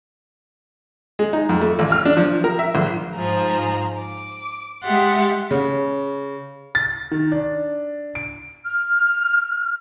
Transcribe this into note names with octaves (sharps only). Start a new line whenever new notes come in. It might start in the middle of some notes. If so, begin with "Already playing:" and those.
G#3
D#4
F2
A3
A1
F6
D4
F3
A#4
E5
A#1
G#2 F3 G#4 A#5
D6
G#3 G4 E5 F#5 C6 A6
C#3
A6
D#3
D4
D7
F6